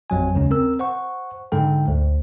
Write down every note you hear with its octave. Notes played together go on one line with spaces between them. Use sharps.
A1 F2 F#3 G#5
D#2 C#3 G#3 C#4
C4 A#4 E6
C5 F#5 C#6
G#2 D3 G#3 A4 G5
D2